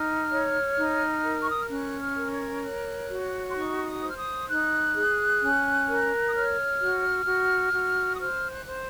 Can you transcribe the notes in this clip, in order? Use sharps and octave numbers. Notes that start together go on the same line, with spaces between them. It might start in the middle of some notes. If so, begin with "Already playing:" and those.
Already playing: D#4 F6
C#5
D#4
A#4
C#6
D#6
F6
C#4 F#6
F6
A#4
G#6
C#5 F#6
F#4
C6
D#4 C#6
D#6
C5
F6
D#6
D#4 F#6
G#4
C#4
A#4
D#6
C#5 F6
F#4
F#4
F#4
D#6
C5 F6
F#6
C5